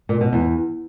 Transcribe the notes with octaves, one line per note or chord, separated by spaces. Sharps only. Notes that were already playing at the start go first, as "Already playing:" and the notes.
A#2
B2
E2